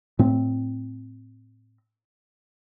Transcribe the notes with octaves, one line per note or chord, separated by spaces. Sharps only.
A2 C4